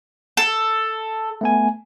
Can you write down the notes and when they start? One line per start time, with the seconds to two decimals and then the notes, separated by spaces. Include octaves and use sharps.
0.37 A4
1.41 A3 B3 G#5